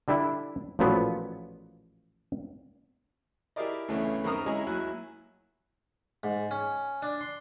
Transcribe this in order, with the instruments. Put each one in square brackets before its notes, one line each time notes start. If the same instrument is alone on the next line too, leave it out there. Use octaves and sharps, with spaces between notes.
[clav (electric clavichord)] D3 G3 D4 E4
A1 A#2 F3 F#3 B3
[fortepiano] E4 G4 G#4 A#4 D5 D#5
D2 C#3 E3 A3 B3 C#4
F#2 D#3 C4 A#5 D#6 F6
G#3 C#4 E4 D#5 G#5 A#5
D#2 F#3 E4 G#5 F#6
[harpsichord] G#2
C#4
D4
C6